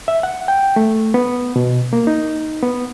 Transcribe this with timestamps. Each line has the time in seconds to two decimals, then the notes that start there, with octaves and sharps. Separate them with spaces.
0.08 E5
0.23 F#5
0.48 G5
0.76 A3
1.14 B3
1.56 B2
1.93 A#3
2.07 D#4
2.63 B3